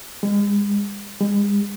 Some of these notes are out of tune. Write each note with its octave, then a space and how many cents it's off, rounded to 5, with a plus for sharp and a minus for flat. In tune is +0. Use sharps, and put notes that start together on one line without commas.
G#3 -35
G#3 -40